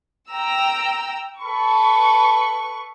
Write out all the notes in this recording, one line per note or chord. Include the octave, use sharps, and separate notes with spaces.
G5 A#5 E6
A4 B4 B5 C#6